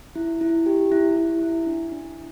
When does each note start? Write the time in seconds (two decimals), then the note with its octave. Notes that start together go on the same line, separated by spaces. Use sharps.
0.16 E4
0.41 E4
0.66 G4
0.92 E4
1.16 E4
1.41 E4
1.66 D4
1.92 D4